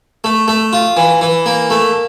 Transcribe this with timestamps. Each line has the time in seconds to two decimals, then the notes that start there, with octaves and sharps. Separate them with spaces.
0.24 A3
0.48 A3
0.73 F4
0.97 E3
1.21 E3
1.46 A#3
1.70 A3